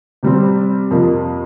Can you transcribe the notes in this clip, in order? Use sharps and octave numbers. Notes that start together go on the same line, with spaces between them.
C3 G3 C4
F2 C3 F3 A#3